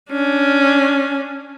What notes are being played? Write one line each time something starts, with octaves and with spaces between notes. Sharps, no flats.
C#4 D4